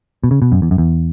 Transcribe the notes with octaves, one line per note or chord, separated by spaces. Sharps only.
B2
C#3
B2
F#2
E2
F#2
E2